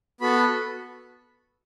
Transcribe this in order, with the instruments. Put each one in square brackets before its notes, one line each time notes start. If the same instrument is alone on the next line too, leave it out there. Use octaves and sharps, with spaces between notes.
[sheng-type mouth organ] B3 F#4 A4 B5